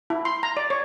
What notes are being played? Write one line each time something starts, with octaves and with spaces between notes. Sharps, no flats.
E4
C6
A#5
D5
C#5